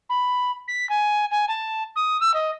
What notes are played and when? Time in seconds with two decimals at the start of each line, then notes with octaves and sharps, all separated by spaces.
0.09 B5
0.68 B6
0.89 G#5
1.31 G#5
1.48 A5
1.96 D#6
2.20 E6
2.34 D#5